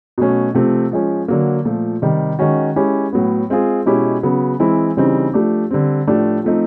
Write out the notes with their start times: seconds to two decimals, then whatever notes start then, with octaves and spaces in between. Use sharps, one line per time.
0.18 B2 F#3 A3 C#4
0.54 C3 F3 A3 C4
0.91 F3 G#3 C#4
1.28 D3 F#3 A#3
1.65 A#2 F3 A3
2.02 C3 D#3 G3
2.39 D#3 G#3 C#4 F#4
2.76 G#3 C#4 E4 G4
3.13 A2 F#3 B3
3.50 G#3 C4 F4 G#4
3.86 B2 G#3 C#4 E4 G4
4.23 C#3 F#3 B3
4.60 E3 G#3 C4 E4
4.97 C#3 E3 G3 C4 D#4
5.34 F3 A3 D4 G4
5.71 D3 G3 C4
6.07 A2 F3 A3 D4 G4
6.44 F3 A3 C4 D#4